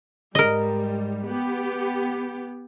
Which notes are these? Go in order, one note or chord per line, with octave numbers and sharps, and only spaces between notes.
G#2 G3 A#4 D#5
B3 G4